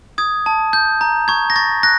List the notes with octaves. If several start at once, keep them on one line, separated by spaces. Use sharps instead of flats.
D#6 G#6
A5
G6
A#5
C#6 G#6
A#6
C#6 A6
F#6 A#6